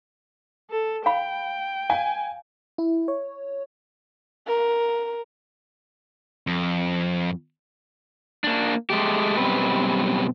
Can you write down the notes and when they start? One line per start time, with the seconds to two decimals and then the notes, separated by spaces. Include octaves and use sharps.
0.70 A4
1.06 F5 G5 B5
1.90 F5 G#5
2.78 E4
3.08 C#5
4.47 A#4
6.47 F2
8.44 A#3 D4
8.90 G#3 A3 G4
9.37 F#2 B2 G3 C4 B4